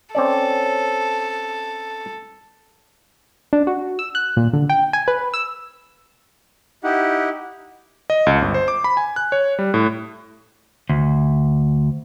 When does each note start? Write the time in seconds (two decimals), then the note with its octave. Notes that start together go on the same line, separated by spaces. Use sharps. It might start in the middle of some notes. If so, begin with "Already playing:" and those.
0.15 C4 C#4 A4 D5
3.53 D4
3.67 F#4
3.99 E6
4.15 F#6
4.37 A#2
4.53 D3
4.70 G5
4.93 G#5
5.08 B4
5.34 E6
6.84 D#4 E4 G4 F#5
8.10 D#5
8.26 C#2
8.42 G1
8.54 C5
8.68 D6
8.84 B5
8.97 G#5
9.16 F#6
9.32 C#5
9.59 G3
9.74 A2
10.89 D2